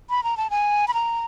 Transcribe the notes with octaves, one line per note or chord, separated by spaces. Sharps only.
B5
A#5
A5
G#5
B5
A#5